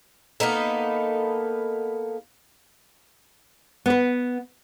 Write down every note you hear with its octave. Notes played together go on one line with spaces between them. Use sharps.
A#3 B3 D#4 A4
B3 B4